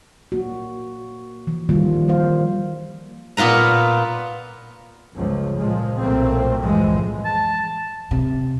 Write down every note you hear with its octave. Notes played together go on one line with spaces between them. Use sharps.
A#3 F#4
E3 F3
D#3 F3 G3 A#3 F4
G3 A#3 C5 F5
A#2 B3 F4 B4 A#5
G1 C#2 F3
A#2 F3 G#3
B1 A#2 A3 A#3 C4
C2 F#2 A2 E3 F3 G#3
A5
C3